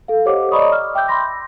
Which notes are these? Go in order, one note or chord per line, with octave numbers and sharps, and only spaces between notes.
A4 F5
G4 C5 C#5 D#5 F#5 D6
D5 D#5 A#5 B5 C#6 D#6
D6 F6
E5 G5 D6 E6 G6
B5 C6 A#6